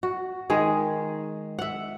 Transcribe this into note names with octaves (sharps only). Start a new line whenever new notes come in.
F#4
D#3 G#3 G#4
E5 F#5